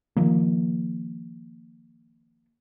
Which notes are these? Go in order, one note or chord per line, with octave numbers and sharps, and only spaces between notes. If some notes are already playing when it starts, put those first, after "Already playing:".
D#3 F3 A#3